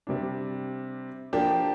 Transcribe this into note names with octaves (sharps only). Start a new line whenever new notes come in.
C3 G3 D4
F3 A#3 D4 G4